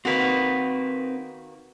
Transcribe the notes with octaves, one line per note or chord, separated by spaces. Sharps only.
D#3 A#3 C4 D#4 F#4 B4